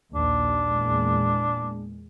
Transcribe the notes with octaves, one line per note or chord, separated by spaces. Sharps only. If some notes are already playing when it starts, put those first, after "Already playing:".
A#1 D#2 D4
E2 A#2 G#3